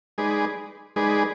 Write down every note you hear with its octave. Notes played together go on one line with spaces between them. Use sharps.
G#3 D#4 G#4 B4 D5
G#3 D#4 G#4 B4 D5